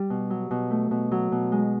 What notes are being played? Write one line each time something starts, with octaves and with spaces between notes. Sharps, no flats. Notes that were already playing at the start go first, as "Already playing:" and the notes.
Already playing: G3
B2
F#3
B2
A3
B2
F#3
B2
G#3